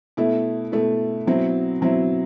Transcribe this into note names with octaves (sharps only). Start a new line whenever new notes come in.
B2 A3 E4
B2 A3 E4
B2 F#3 C4 E4
B2 F#3 C4 E4